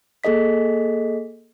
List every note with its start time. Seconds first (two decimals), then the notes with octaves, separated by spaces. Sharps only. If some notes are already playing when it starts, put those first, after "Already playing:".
0.24 A#3 G#4 A4 D#5 B6